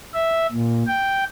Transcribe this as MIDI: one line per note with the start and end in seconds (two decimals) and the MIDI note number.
0.14 0.47 76
0.52 0.84 46
0.87 1.24 79